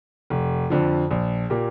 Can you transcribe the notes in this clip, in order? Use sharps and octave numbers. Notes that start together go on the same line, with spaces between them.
F1
F2 D3 F3
A#1
A#2 A#3 G4